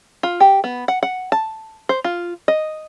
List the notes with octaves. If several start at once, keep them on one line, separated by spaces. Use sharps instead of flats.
F4
G4
B3
F#5
F#5
A5
C5
F4
D#5